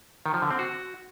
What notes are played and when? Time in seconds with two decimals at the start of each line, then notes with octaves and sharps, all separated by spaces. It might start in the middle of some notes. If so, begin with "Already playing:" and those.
0.26 D#3
0.34 F3
0.42 D3
0.51 C4
0.59 F#4